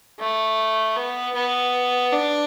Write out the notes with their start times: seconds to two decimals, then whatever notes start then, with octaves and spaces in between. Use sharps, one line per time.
0.20 A3
0.96 B3
1.35 B3
2.13 D4